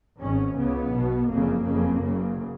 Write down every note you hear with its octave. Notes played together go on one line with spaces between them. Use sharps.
G#1 G#2 C#4
C#2 C#3 B3
B1 B2
F#1 F2 C#3 A#3
F#1 F2 C#3
F#1 F#2 C#3